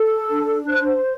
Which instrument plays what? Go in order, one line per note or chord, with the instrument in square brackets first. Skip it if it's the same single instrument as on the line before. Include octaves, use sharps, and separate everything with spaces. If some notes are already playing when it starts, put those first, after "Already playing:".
Already playing: [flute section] A4
D4
C5 F#6